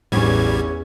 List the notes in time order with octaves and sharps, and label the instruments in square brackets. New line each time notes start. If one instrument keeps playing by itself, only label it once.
[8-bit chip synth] A1 G3 G#6 [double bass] E2 C#4